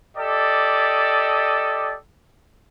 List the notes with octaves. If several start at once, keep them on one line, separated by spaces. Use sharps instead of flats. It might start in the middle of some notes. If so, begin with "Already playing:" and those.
G4 A4 D5 D#5